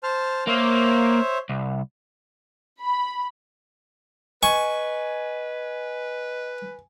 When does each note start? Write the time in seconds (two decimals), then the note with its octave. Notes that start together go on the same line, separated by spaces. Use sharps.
0.03 C5 A5 F6
0.47 A#3 C5 C#5 E5
1.50 C2
2.82 B5
4.43 B4 D#5 G#5 C#6